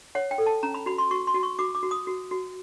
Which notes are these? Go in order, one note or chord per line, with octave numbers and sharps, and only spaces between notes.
C#5 F#5
G5
A4
A5
C#4 A#5
B5
F#4 B5
C6
F#4 C#6
C6
F#4
C#6
F#4 D6
D6
F#4
D#6
F#4
F#4